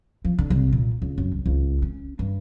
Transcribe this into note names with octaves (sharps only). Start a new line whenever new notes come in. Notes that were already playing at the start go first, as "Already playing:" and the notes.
F3
D3
C2
A#2
C#2
F#2
C2
C#2
C#4
G2